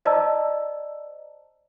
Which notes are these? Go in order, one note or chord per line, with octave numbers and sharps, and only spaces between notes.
C5 D5 D#5 A5 A#5 E6